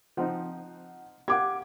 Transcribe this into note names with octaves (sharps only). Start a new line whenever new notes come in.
F3 C4 D#4 F#5
G4 F5 F#5 D6 G#6